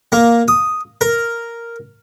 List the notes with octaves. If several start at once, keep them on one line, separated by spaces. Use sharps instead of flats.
A#3
D#6
A#4